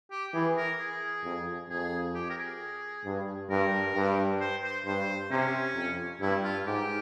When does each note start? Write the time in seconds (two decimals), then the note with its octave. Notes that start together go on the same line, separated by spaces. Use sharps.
0.11 G4
0.34 E3 G#4
0.57 A#4
0.79 G#4
1.24 F2
1.69 F2 G#4
2.15 G4
2.30 A#4
2.37 G#4
3.05 G2
3.50 G2 A#4
3.95 G2
4.40 C5
4.63 C5
4.86 G2 C5
5.30 C3 C#4
5.75 F2
6.21 G2 E4
6.43 F4
6.66 G#2 G4